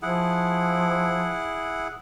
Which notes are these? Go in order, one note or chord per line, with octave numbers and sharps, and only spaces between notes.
F3 E4 G#4 F#5